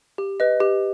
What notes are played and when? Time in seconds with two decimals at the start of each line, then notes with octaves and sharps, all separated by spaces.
0.18 G4
0.40 B4 D#5
0.60 G4